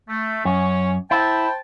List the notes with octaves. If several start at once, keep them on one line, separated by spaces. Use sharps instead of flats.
A3
F#2 C#4 C#5
E4 C5 G5 A5